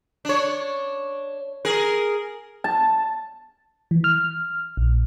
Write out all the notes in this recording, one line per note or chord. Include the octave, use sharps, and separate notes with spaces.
D4 C#5
G#4 A#4
A5
E3
F6
A#1